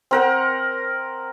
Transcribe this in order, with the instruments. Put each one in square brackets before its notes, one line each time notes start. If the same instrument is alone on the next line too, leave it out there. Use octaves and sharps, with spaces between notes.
[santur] C4 A#4 F#5